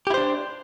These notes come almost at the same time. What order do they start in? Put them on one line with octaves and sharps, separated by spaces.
G4 E4 C5 D4